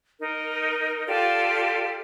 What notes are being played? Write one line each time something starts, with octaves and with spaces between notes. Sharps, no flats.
D#4 A#4
F4 G4 A4 D5